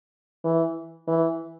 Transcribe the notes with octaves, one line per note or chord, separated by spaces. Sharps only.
E3
E3